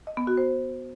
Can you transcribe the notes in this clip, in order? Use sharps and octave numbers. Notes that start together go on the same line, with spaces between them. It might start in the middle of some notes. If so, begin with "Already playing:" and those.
D#5
B3
F#4
C5